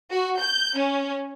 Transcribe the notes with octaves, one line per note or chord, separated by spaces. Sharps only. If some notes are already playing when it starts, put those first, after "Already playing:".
F#4
G6
C#4